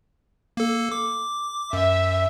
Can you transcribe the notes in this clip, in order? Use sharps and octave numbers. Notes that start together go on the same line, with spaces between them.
A#3 A4
D6
F#2 E5